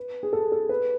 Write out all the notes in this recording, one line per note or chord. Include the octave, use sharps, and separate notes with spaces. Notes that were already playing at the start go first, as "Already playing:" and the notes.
Already playing: B4
G#4
A4
A4
B4